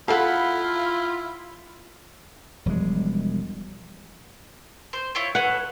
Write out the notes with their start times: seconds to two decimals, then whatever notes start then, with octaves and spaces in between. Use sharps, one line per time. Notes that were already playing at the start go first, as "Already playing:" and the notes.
0.08 E4 F4 A4 F5 F#5 B5
2.66 E1 F3 G3 G#3
4.93 C5
5.15 E4 F4 C#5
5.35 A4 B4 C#5 F#5